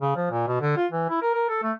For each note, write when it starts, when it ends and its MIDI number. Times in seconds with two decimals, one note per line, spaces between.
0.01 0.13 49
0.16 0.27 53
0.31 0.47 46
0.47 0.58 47
0.61 0.74 50
0.76 0.87 65
0.92 1.06 52
1.09 1.18 64
1.22 1.33 70
1.34 1.45 70
1.49 1.62 69
1.63 1.72 57